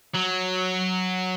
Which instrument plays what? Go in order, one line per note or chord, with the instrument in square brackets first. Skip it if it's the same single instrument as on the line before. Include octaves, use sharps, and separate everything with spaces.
[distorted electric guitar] F#3